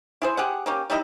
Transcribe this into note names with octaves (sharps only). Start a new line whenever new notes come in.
E4 G#4 C5
G4 G#4 F#5
A#3 C#4 G4
G3 D#4 E4 D#5